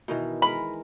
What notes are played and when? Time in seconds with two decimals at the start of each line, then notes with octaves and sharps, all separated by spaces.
0.08 B2 D#3 E3
0.42 G#3 A#4 B5